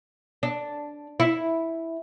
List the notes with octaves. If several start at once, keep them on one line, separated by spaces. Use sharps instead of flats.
D4
E4